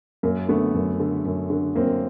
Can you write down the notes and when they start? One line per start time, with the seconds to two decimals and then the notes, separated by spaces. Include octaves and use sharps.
0.23 F#2 A#3
0.48 D3 A3 B3
0.74 F#2
1.00 D3
1.25 F#2
1.50 D3
1.75 F#2 A#3 C4